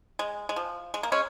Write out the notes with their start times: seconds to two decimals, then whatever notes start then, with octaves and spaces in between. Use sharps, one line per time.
0.19 G#3
0.49 G#3
0.56 F3
0.94 G#3
1.03 A#3
1.12 G#3 C#4